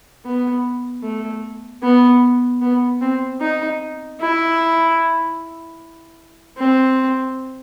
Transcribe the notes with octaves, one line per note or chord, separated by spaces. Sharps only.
B3
A3
B3
B3
C4
D#4
E4
C4